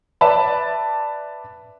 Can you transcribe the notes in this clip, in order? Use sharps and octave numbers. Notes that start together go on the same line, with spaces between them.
B4 D5 E5 A5 B5